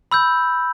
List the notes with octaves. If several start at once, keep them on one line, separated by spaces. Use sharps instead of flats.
B5 E6 G6